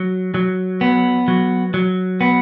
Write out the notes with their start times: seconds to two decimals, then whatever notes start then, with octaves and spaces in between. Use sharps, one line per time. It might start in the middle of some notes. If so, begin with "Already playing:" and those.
Already playing: F#3
0.34 F#3
0.81 B3
1.28 F#3
1.74 F#3
2.21 B3